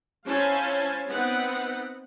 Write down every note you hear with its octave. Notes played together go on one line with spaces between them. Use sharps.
C#4 E4 C5 F5 G#5 A5
B3 C4 D#4 B4 F#5